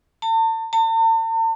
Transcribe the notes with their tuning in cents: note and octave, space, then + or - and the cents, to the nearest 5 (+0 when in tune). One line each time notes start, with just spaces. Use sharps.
A5 +40
A5 +45